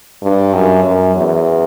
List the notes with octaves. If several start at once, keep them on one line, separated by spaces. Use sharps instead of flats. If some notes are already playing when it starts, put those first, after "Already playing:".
G2
F#2
F#2
E2